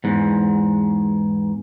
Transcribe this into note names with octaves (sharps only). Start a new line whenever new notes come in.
E2 G#2